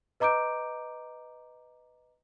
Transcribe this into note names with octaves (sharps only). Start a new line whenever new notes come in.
B4 D#5 A#5 D6 G6 D7